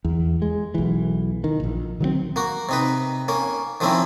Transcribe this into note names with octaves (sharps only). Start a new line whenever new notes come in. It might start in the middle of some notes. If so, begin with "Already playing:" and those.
E2
G#3
B1 E3
D#3
E1 A#1
D#3 F#3 G#3 C4
A#3 F#4
C3 D#4 B4
A#3 C#4
D#3 F3 A#3 C4 C#4 E4